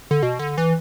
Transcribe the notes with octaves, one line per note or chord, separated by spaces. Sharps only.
D3
B2
D3
E3